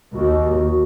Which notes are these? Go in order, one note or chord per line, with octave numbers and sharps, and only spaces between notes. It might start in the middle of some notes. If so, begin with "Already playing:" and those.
D#2 F#4